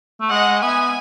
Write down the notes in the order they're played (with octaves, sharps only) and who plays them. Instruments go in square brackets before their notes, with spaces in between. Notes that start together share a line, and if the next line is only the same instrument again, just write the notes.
[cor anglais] A3
[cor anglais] G#3 [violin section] D#5 F#5
[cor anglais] B3 [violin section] E5 G#5